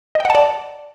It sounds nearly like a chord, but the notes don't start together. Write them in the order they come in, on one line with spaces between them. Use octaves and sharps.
D#5 G5 F#5 A5 D5